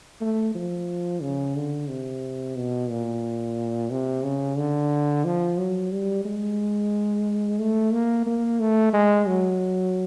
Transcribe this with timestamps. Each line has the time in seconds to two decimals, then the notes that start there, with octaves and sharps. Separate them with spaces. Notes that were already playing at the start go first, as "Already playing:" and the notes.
0.21 A3
0.55 F3
1.22 C#3
1.56 D3
1.89 C3
2.56 B2
2.90 A#2
3.90 C3
4.24 C#3
4.58 D3
5.25 F3
5.58 F#3
5.92 G3
6.25 G#3
7.59 A3
7.93 A#3
8.27 A#3
8.60 A3
8.93 G#3
9.27 F#3